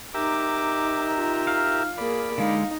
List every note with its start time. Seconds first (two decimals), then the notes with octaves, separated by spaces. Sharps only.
0.14 D#4 G4 A#4 E5 D6
1.14 F4
1.47 F5
1.98 A#3 G#4 D5 B5
2.38 D3 G#3 D#4 F5